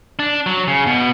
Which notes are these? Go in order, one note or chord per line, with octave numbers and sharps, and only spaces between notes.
D4
F#3
C#3
B2